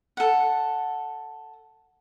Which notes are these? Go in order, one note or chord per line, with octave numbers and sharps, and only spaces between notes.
A4 F#5